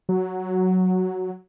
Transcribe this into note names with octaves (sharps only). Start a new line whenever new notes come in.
F#3